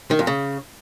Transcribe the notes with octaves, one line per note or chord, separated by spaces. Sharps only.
D#3
F2
C#3